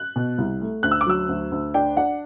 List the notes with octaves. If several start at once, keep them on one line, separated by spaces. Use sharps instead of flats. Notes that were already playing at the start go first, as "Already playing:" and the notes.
Already playing: F#6
B2
C2
A3
D2 F#6
E6
D6
F#3 E6
D2
D2
D4 G5
D4 F#5